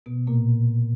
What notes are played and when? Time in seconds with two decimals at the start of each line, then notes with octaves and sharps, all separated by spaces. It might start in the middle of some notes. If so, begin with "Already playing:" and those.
0.06 B2 B3
0.27 A#2 A#3